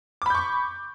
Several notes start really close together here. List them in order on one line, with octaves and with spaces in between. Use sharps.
D6 B5 G6 C#6